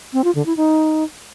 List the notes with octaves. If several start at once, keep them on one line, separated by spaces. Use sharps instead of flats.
C4
F4
D3
E4
D#4